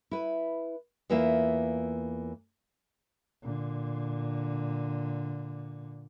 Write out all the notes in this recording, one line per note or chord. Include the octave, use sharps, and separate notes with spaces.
E4 B4
E2 E3 A#3 F4 E5 F5
A#2 D3